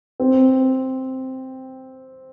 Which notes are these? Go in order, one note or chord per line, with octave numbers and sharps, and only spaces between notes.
C4